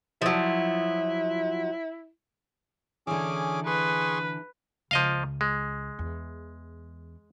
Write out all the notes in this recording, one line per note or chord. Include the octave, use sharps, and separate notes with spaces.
F3 F#3 E4
D3 E3 C#4 G#4 D6
G#4 B4 C6 C#6
C#2 F3 D#5 F5
G#3
E2